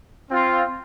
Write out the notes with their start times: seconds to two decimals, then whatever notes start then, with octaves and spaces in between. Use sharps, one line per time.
0.30 C4 F4